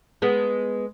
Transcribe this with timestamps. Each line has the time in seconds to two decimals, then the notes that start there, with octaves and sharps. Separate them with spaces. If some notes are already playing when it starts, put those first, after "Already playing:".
0.22 G#3 B3